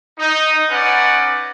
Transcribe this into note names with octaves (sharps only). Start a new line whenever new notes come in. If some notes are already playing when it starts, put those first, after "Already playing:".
D#4
C#4 D#4 B4 D5 F#5